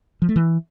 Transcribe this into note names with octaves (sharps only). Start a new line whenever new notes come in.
F3
A3
E3